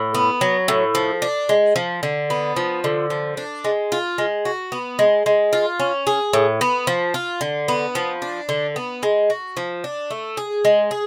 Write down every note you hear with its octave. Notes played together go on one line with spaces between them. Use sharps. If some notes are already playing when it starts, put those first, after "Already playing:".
Already playing: A2
B3
F#3
A2
F3
D4
G#3
F3
D3
B3
F3
D3
F3
D4
G#3
F4
G#3
F#4
B3
G#3
G#3
F4
C#4
G#4
A2
B3
F3
F4
D3
B3
F3
D4
D3
B3
G#3
F#4
F3
D4
A3
G#4
G#3
G#4